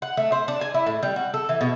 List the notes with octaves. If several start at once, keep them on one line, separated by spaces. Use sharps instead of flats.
F#5
A3
C5
D4
G#5
E4
A2
G3
F#4
A4
E3
B2